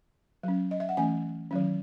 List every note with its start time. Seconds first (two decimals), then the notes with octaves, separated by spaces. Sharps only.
0.43 F#3 C#4
0.71 D#5
0.80 E5
0.89 F#5
0.97 E3 A3 C#4 G#5
1.51 D#3 F#3 C#4